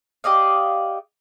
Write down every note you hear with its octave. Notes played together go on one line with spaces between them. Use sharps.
G4 D5 D#5 F5